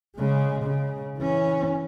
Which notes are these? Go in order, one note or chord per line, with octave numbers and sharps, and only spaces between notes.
C#3 G#3
C#3
E3 C#4